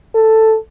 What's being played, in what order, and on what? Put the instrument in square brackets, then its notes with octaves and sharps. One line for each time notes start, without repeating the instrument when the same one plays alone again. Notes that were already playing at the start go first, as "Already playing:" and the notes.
[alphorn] A4